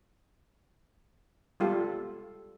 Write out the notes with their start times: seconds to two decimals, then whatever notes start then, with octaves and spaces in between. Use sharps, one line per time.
1.60 G3 G#3 B3 F4 G4 A4